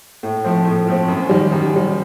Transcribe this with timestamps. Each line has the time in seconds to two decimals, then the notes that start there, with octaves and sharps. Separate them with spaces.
0.23 A2
0.44 F3 A3 C4
0.65 A2
0.87 F3 A3 C4
1.08 F#2
1.29 D#3 G3
1.52 F#2
1.73 D#3 G3